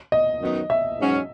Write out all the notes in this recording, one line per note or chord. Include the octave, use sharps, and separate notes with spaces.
D#5
F#2 D#3 F#3 B3 D#4
E5
G#2 F#3 C#4 F#4